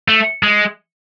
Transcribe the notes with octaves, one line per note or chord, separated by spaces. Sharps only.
A3
G#3